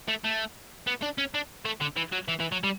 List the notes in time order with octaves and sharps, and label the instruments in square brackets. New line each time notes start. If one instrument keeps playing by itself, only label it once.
[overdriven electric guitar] A3
A3
B3
D4
C#4
D4
A3
D3
E3
F#3
E3
E3
F#3
G3